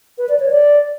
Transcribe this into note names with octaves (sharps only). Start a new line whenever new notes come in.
B4
D5
C#5
D5